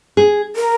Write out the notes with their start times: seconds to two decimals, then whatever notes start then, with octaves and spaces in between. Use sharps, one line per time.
0.17 G#4
0.56 A#4